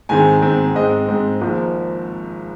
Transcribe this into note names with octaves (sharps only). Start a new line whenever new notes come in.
G#2 D#3 G#3 C4 G#5
G#2 D#3 G#3 C4
G#2 G#3 C4 D#5
G#2 G#3 C4
G#1 G#2 F3 A#3